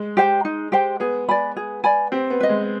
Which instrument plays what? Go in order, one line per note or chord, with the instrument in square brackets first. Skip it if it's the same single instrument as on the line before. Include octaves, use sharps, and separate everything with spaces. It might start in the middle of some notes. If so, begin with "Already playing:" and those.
Already playing: [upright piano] G#3
[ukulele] G4 C5 G5
D#4
G4 C5 G5
[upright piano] B3 [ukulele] G#4
[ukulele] D5 G#5 B5
G#4
D5 G#5 B5
[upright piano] C4 [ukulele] G4
[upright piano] B3
[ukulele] B4 D#5
[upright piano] G#3